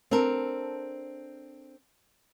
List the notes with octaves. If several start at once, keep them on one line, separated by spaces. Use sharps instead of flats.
C4 D4 A4 A#4